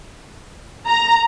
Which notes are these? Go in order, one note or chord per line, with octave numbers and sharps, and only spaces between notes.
A#5